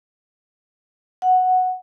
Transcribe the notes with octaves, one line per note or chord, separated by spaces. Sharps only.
F#5